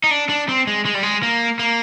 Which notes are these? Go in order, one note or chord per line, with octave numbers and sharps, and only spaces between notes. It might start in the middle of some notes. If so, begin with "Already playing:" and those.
D#4
D4
D4
C4
G#3
G#3
G3
G#3
A#3
A#3